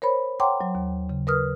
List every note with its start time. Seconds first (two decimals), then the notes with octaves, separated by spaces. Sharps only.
0.02 A#4 C5 C#5 B5
0.40 C#5 F#5 G5 A#5 C6 D6
0.61 F#3
0.75 D#2
1.09 C#3
1.27 A#4 B4 D#6 F6